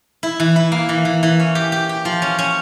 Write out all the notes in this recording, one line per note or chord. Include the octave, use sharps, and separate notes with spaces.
E4
E3
E4
A#3
E3
E3
E3
C#4
G4
G4
G4
F3
C#4
C#4